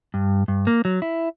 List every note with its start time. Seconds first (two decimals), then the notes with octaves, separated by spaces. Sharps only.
0.14 G2
0.48 G2
0.67 A#3
0.85 F#3
1.02 E4